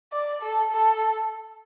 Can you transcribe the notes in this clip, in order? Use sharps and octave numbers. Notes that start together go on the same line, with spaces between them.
D5
A4
A4